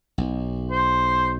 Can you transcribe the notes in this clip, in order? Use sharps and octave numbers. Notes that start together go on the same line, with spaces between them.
B1
C5